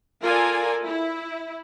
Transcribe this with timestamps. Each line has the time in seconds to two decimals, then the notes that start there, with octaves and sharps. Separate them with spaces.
0.22 F4 A4 A#4 D5 G#5
0.85 E4